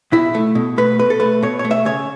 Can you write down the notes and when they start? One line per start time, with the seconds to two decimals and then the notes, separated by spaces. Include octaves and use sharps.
0.12 B2 E4
0.35 A3
0.55 B2
0.78 A3 B4
0.99 B2 B4
1.10 A4
1.20 A3 B4
1.43 B2 C#5
1.59 C#5
1.65 A3
1.71 E5
1.85 C#3 C#5